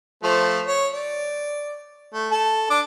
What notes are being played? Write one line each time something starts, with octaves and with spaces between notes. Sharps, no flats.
F3 A3 C5
C#5
D5
A3
A4
D4 D6